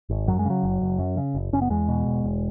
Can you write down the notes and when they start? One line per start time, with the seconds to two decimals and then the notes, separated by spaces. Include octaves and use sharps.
0.09 G#1
0.28 F#2 F#3
0.39 G#3
0.45 C#3 F#3
0.63 F#1
0.81 F#1
0.99 F#2
1.17 C#3
1.35 F#1
1.53 F#1 C#4
1.62 B3
1.70 E2 G#3
1.88 B2
2.06 E1
2.24 E1